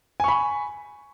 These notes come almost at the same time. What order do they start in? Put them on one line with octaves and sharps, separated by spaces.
G#5 C#6 B5